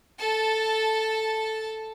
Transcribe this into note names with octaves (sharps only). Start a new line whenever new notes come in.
A4 A5